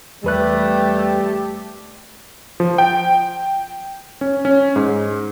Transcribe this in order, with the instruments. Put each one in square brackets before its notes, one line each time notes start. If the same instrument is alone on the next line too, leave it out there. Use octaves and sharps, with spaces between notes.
[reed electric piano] E2 B4 F#6 [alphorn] G3 [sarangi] A3 [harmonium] G4
[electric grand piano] F3
G5
C#4
C#4
G#2